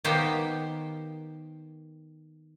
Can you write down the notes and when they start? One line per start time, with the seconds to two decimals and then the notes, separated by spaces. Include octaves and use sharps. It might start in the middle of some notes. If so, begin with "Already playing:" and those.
0.04 D#3 A#3 B3 G4 C5 G5